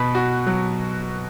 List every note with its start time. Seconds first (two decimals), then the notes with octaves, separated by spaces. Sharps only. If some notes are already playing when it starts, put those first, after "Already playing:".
Already playing: B2 B4
0.15 F#4
0.46 F#3